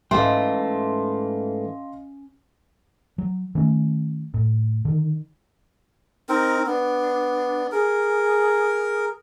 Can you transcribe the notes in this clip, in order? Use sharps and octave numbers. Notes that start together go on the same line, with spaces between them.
G#2 E3 A3 C#4 D#5 F5 G5 C6
F#3
D#3 A3 C#4
A2
D3 D#3
C4 D#4 A#4
B3 D4
G#4 A#4